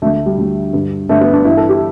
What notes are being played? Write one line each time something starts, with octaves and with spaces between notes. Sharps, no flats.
D2 D3 A3
A3
G3
D2 D3
G2 D3
G2 D3 A3
B3
D4
G2 E3 E4
A4
G4